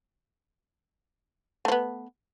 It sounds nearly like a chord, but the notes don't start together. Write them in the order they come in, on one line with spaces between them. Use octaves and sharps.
A3 F3 B3